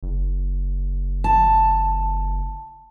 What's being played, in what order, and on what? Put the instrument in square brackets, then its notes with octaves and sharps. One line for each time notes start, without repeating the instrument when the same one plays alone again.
[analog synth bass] F#1
[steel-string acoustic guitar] A5